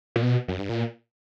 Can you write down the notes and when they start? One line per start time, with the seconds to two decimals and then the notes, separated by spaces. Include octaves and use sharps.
0.16 A#2
0.22 B2
0.48 F#2
0.59 G2
0.69 A#2